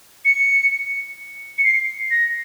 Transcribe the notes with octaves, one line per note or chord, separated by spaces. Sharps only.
C#7
C#7
C7
A#6